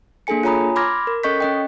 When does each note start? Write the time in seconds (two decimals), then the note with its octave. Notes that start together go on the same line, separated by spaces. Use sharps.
0.27 A#3 D4 G#4 A4 G#5 C#7
0.43 F4 C#5 G#5 A#5 B5 D#6
0.76 B5 C6 D6 F6 G#6 A#6
1.07 A#4
1.23 C#4 A4 D#5 C#6 G6 B6
1.40 C#4 D#5 G5